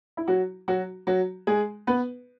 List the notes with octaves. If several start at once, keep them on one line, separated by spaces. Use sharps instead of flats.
E4
F#3 F#4
F#3 F#4
F#3 F#4
G#3 G#4
B3 B4